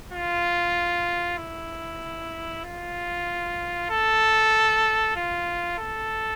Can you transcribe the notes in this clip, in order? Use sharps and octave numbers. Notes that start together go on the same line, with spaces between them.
F4
E4
F4
A4
F4
A4